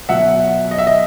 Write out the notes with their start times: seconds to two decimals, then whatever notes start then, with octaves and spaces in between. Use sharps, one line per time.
0.09 B2 F#3 E5 F#5
0.71 D#5
0.78 E5
0.87 D#5